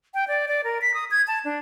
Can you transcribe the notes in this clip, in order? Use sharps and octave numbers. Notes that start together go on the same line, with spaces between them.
G5
D5
D5
A#4
B6
D#6
G#6
A5
D4